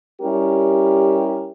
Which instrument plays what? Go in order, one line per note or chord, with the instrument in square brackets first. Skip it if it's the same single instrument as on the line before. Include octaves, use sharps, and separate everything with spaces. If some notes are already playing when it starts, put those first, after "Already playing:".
[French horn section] G3 C#4 E4 G4 A#4